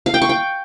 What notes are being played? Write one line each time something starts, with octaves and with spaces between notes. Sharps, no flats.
F5
G5
C#6
G5